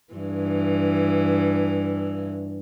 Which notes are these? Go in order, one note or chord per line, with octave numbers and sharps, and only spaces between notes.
G2 E3